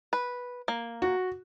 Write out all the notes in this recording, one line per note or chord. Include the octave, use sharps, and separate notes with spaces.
B4
A#3
F#4